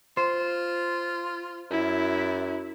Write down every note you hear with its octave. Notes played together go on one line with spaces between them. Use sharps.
F4 C5
F#2 E4